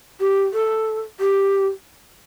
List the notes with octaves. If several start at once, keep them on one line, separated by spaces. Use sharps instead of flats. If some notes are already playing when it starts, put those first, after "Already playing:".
G4
A4
G4